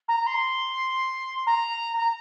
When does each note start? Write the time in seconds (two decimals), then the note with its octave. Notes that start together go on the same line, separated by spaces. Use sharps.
0.08 A#5
0.26 C6
1.46 A#5
1.97 A#5